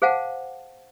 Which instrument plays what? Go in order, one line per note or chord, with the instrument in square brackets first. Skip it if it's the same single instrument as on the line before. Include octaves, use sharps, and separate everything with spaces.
[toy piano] G#4 C5 F5 F#5 A5